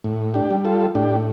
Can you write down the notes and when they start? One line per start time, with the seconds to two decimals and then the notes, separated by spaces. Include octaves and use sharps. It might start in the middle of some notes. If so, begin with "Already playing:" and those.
0.04 A2
0.34 D4 G4
0.51 G3
0.65 F4 A4
0.95 A2 D4 G4